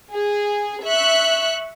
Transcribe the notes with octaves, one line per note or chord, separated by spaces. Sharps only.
G#4
E5 C#6 F#6